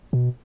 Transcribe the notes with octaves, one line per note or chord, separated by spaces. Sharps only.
B2